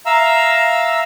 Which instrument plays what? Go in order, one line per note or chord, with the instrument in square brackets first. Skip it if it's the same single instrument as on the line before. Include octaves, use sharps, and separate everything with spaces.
[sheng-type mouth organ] E5 F5 A#5 E6